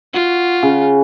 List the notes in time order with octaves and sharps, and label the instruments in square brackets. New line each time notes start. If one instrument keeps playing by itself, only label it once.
[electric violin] F4 [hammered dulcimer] F#4
[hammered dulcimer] C#3